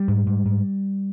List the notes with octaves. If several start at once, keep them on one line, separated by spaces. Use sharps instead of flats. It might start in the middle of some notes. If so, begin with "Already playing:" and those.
Already playing: G3
G#2
G#2
G#2